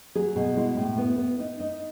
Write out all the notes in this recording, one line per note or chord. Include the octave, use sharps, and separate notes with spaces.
F#3 G#4
B2
G#3 E4
A2
B3
B3
D#4
D#4